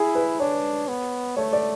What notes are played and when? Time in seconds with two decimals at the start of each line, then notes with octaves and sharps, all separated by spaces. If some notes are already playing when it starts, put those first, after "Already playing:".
Already playing: E4 G#4
0.15 B4
0.40 D4 C#5
0.88 B3
1.37 A3 C#5
1.53 D5